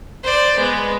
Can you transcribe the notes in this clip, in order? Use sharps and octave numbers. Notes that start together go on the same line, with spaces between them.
C5 D5
G#3 B3